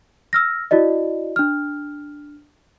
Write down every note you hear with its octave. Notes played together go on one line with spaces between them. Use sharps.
E6 F6 A#6
E4 F#4 D5 D#5
D4 F6